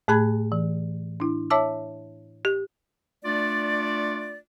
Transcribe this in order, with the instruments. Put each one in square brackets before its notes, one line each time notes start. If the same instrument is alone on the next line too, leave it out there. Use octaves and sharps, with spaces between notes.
[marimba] A2 A3 G#4 A5 B5 G#6
E3
D4 E4
C#5 E5 A5 D6 E6
G4
[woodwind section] A3 D4 F4 D5